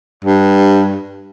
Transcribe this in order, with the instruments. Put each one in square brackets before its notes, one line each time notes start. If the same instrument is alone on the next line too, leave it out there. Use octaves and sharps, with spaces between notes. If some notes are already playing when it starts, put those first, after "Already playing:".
[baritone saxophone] G2